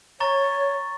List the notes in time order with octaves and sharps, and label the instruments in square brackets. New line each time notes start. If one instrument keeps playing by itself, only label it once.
[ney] C#5 [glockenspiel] A#5 C#6 A6